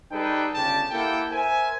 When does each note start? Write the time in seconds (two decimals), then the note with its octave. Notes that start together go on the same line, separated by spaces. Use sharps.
0.12 G3 D#4 G#4 A4 B4 G5
0.54 G1 C#3 D4 G4 G5 A5
0.91 A#3 E4 G4 A4 F#5 G5
1.31 A#4 C5 E5 G#5